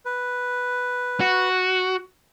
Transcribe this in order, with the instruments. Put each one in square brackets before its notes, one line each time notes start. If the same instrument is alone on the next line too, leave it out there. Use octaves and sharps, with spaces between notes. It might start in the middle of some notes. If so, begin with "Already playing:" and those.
[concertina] B4
[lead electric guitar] F#4